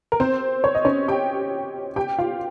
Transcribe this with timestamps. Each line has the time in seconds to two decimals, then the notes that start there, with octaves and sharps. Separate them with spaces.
0.12 A#4
0.20 C4 C5
0.64 C#5
0.75 D#5
0.85 C#4 C#5
1.08 G4 G5
1.96 G4 G5
2.18 F4 F5